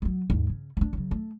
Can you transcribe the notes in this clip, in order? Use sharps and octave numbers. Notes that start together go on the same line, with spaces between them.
F#3 G3
D#2 G#2
C#3
C#4 D4
C#3 F#3
A3